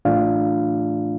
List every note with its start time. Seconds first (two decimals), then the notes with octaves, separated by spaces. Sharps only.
0.05 A2 E3 A3 D4 F4 F5